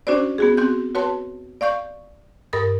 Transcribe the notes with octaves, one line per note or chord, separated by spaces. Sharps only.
C#4 D4 F#4 C5 D5
B3 F#4 G#4
C4 F#4 G6
F#4 B4 C#5 A5 C6
D5 F5 C#6 G6
G2 A#4 D#6 A6